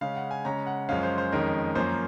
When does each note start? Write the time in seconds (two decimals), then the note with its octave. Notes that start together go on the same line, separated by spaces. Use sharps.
0.01 C#3 G#3 C#4 F5
0.16 F#5
0.31 G#5
0.45 C#3 G#3 C#4 A#5
0.67 F#5
0.89 F#2 F3 G#3 C#4 F5
1.03 C5
1.18 C5
1.32 F2 D#3 G#3 C#4 A#4
1.75 F#2 F3 A#3 C#4 C5